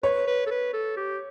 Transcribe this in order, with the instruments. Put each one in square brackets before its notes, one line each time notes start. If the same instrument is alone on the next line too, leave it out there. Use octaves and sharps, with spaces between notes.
[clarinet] B4 [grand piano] C#5
[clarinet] B4
A4
B4
A4
G4